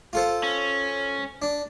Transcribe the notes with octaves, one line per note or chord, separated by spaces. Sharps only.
F4 A4 C5
C#4
D4